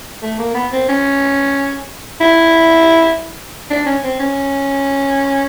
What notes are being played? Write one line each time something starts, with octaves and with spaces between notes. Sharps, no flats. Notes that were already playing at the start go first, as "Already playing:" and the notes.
A3
A#3
B3
C4
C#4
E4
D4
C#4
C4
C#4